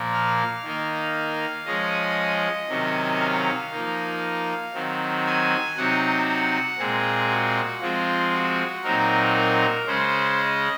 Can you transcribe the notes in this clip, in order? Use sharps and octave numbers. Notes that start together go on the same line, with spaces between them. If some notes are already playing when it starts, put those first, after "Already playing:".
Already playing: A#2 F3 A#3
F5
D#3 A#3 D#4
F3 G#3 C#4 D#5
C3 D#3 F#3 C#4
F5
F3 A#3 D#4
D#3 F#3 C4
G#5
C3 F#3 C4 D#4 F#5
F#5
A#2 G#3 C4 G#4
F#4
F3 G#3 C4 F4
F#4
A#2 F#3 C4 D#4 A#4
A#4
C#3 G#3 C#4 C5
D#5